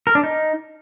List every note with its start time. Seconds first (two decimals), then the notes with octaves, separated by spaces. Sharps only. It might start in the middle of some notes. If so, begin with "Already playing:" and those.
0.07 A#4
0.15 D4
0.23 D#4